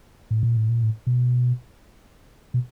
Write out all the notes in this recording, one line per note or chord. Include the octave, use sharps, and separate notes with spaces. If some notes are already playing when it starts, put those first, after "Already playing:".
A2
A#2
A2
A#2
A2
B2
B2